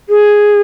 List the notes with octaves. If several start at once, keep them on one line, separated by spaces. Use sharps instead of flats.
G#4